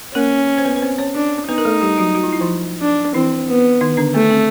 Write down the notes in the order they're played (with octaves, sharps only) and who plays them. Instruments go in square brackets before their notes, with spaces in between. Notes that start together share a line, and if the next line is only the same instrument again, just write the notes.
[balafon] A#3 A#4 [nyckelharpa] C#4
[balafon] C5
B3 B4
B4
C4 C5
C#4 C#5
[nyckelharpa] D4
[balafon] B3 B4 [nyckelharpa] D#4
[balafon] A#4
A3 A4
G3 G4
F#3 F#4
F#4
F4
E4
F3 F4
[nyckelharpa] D4
[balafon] E3 E4 [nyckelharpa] C4
[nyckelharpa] B3
[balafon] D#3 D#4
D3 D4
[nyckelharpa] A3 [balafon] B3
[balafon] C4